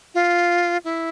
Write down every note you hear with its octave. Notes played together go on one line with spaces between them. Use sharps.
F4
E4